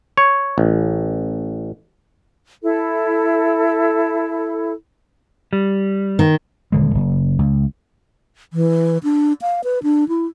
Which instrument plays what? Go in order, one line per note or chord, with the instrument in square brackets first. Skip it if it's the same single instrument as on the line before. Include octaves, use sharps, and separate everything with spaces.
[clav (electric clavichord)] C#5
A1
[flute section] E4 A4
[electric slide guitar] G3
[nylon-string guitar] D#3
[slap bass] D#1 D3 G#3
F#1
C#2
[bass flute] E3
D4
F5
B4
D4
E4